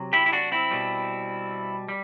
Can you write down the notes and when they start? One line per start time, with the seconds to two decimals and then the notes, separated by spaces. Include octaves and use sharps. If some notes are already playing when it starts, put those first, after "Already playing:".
Already playing: C3 F#3
0.13 E4 G4
0.26 E4
0.32 D4 F#4
0.52 C4 E4
0.71 B2 G3
1.89 G3